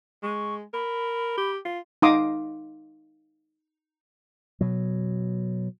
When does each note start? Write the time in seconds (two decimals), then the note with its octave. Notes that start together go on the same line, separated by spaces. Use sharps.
0.23 G#3 C#6
0.74 A#4 B5
1.38 G4
1.65 F4
2.02 D#4 F5 A#5 C6 D6 D#6
4.61 B2 F#3